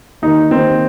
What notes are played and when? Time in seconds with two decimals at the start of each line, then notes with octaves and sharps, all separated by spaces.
0.22 D#2 D#3 D#4
0.51 D#2 D#3 C4